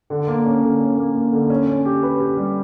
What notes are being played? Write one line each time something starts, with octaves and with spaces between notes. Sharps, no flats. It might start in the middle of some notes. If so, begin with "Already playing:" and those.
D3
A#3
C#4
D3
C#4
A#3
A#3
D3
C#4
C#4
G4
B4
G4
G3